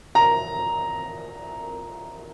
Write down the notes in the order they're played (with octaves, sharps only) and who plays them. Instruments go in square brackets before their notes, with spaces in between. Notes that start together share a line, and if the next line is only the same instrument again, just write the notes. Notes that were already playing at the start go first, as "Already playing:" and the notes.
[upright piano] A#5